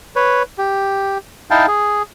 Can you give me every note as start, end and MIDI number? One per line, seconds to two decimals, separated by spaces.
0.16 0.43 71
0.16 0.43 73
0.58 1.18 67
1.51 1.66 63
1.51 1.66 64
1.51 1.66 77
1.51 1.66 79
1.51 1.66 81
1.68 2.02 68